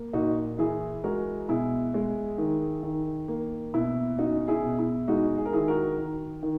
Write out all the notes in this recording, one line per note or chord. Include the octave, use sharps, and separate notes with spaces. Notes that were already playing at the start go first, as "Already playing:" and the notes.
Already playing: A#3
A#2 D#4 F#4
E3 E4 G#4
G#3 F#4 A#4
B2 E4 G#4
G#3
D#3
D#3
A#3
B2 E4
C#4 D#4 F#4
E4 G#4
B2
E4
G#3 D#4 F#4
G#4
A#4
D#3 E4 G#4
F#4 A#4
D#3
D#3